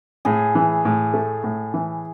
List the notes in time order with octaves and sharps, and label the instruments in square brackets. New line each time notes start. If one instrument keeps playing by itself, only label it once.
[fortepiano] A2 [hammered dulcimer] G#4
[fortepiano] E3
A2
A3
A2
E3